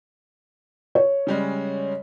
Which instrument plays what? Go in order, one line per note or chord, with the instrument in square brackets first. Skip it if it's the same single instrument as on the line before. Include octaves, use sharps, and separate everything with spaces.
[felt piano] C#5
[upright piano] C#3 G3 G#3